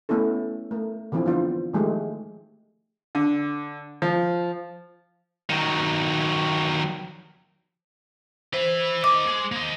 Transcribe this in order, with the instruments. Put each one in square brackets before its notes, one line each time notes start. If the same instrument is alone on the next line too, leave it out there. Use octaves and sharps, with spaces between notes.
[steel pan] A3 B3 C#4 E4 A4
A3 A#4
D3 E3 F3 C4 E4 F4
B3 D4 F4 C5
D#3 F3 G#3 A3 G4 G#4
[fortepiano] D3
F3
[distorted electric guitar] D#3 F#3
[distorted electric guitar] B4 E5 [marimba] C5
[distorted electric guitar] A#3 D#5 [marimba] D6
[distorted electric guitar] G#4 C6
A#3 D#5